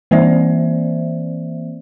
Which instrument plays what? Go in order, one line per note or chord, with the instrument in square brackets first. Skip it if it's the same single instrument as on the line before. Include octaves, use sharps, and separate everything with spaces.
[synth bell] E3 A#3 C4 C5 D5 E5